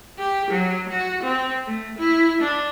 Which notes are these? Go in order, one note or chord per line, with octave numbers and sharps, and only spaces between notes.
G4
F#3
F#4
C4
A3
E4
D4